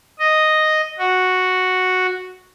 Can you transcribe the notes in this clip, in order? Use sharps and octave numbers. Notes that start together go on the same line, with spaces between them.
D#5
F#4